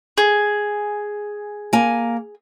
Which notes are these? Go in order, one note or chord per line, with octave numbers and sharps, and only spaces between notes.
G#4
A#3 G#5